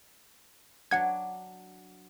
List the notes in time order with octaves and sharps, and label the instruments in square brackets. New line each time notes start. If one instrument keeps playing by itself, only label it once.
[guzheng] F#3 D4 [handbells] F#5 G#6